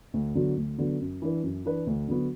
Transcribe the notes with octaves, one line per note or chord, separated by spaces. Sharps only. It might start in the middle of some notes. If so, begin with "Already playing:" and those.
D2
D3 F#3 B3 F#4
D2
D3 F#3 B3 F#4
F#2
E3 D4 B4
F#2
E3 D4 B4
D2
D3 F#3 B3 F#4